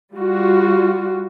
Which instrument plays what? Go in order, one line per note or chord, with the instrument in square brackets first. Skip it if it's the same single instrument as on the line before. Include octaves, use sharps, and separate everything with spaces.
[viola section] G3 F4 F#4